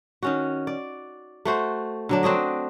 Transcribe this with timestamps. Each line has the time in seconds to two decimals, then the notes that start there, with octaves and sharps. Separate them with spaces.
0.23 D#3 C#4 F#4
0.67 D5
1.45 A3 F#4 C5
2.09 D3 F#3 D4
2.23 C4 D4 F#4 D#5